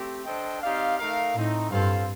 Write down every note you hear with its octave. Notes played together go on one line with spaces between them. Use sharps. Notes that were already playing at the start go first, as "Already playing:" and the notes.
Already playing: A3 C4 G4
D4 A4 C5 D#5 G5
C4 D#4 G4 D5 F5
A3 D#4 A#4 F5
A2 A3 C4 D#4
G2 C4 F4 A4 C5 F5